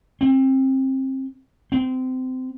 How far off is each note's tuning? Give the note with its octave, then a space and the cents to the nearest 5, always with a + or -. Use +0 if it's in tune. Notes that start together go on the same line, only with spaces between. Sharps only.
C4 +25
C4 -25